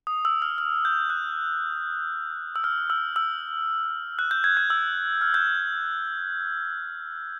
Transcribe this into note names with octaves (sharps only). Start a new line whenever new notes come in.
D#6
E6
F6
F6
G6
F#6
E6
F6
E6
E6
F#6
G6
G#6
F#6
E6
F6
G6